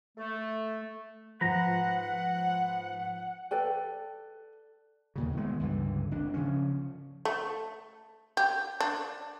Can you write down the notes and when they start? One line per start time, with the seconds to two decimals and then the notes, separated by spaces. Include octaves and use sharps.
0.16 A3
1.41 G#2 F3 B4 F#5 A#5
3.51 A4 B4 D5 G5
5.16 D#2 A#2 C#3
5.37 D#3 G#3 A3 B3
5.60 C#2 G2 D3 E3
6.11 G#1 D4
6.34 C#3 F3 C#4
7.25 A3
8.37 G4
8.80 D4